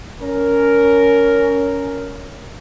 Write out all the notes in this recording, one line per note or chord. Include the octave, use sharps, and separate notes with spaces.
C#4 A#4